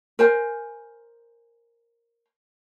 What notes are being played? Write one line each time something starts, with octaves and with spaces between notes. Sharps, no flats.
A#4 C5 G#5